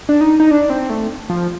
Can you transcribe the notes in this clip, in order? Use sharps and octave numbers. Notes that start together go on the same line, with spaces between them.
D4
D#4
D#4
D4
C4
A3
F3